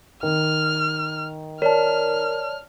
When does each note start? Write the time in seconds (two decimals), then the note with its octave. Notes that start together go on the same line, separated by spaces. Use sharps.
0.23 D#3 F6
1.62 A#4 C#5 D5 A5 F6